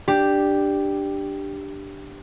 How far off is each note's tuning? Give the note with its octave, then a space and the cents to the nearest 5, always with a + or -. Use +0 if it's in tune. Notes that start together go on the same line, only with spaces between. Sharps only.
D4 +10 G4 +0